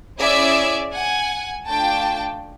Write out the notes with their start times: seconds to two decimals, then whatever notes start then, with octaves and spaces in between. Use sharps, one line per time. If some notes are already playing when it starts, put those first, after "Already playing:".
0.19 C#4 E4 G#4 D5 E5
0.93 F#5 G#5
1.67 A3 D4 F4 G5 A5